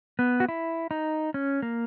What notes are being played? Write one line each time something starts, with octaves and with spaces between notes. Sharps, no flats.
B3
F#4
E4
D#4
C#4
A#3